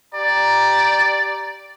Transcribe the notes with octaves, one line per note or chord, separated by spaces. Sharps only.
G4 D5 A#5